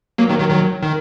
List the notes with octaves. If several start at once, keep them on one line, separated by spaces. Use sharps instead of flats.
F#3 A#3
D#3 F#3
D#3 F#3
D#3 F#3
D#3